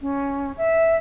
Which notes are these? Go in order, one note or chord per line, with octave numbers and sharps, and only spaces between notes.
C#4
E5